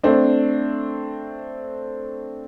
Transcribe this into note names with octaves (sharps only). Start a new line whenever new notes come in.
A3 C4 D4